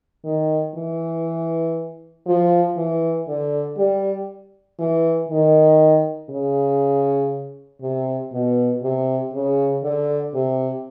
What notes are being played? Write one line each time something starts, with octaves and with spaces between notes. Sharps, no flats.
D#3
E3
F3
E3
D3
G3
E3
D#3
C#3
C3
B2
C3
C#3
D3
C3